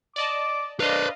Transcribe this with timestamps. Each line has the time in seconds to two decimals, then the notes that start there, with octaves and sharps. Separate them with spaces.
0.16 D5 D#5 A5 D6
0.80 D4 B4 C5 D#5 F5